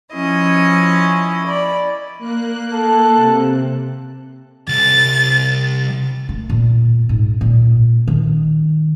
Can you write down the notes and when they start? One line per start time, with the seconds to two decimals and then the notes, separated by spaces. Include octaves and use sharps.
0.14 F3 C#4 E4 D#5
1.46 D5 B5
2.18 A#3 F#6
2.73 A4
3.16 C3
4.68 C2 A6
6.29 A3
6.50 A#2
7.09 G#2
7.41 A#2
8.08 D#3